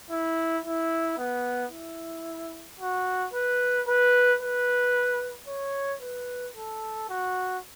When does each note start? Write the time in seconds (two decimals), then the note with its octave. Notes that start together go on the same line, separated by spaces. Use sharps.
0.10 E4
0.65 E4
1.17 B3
1.71 E4
2.79 F#4
3.33 B4
3.87 B4
4.41 B4
5.47 C#5
6.01 B4
6.56 A4
7.09 F#4